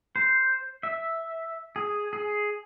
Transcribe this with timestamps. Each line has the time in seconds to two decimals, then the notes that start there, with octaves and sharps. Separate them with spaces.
0.16 C5
0.83 E5
1.76 G#4
2.13 G#4